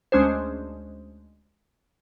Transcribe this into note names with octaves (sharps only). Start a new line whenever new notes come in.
D2 G#3 C#4 D4 G#4 C5